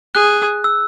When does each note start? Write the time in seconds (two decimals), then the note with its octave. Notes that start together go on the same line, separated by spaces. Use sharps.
0.15 G#4 F#6
0.64 E6